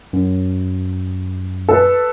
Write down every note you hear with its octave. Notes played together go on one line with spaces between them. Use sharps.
F#2
A4 B4